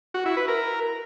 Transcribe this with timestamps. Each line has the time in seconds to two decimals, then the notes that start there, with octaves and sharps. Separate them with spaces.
0.14 F#4
0.26 E4
0.37 B4
0.48 A#4